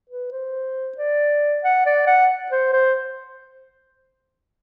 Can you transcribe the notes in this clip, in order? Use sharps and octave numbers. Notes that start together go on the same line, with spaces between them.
B4
C5
D5
F#5
D5
F#5
C5
C5